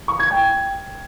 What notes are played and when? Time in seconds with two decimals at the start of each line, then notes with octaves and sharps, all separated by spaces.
0.08 C#6
0.19 G#6
0.31 G5